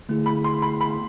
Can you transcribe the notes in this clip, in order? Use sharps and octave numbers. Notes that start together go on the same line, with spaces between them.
D3 A3 E4 G#4
B5
C6
B5
B5